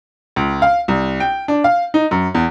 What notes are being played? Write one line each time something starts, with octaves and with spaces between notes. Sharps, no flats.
C#2
F5
C2
G5
D4
F5
D#4
F#2
E2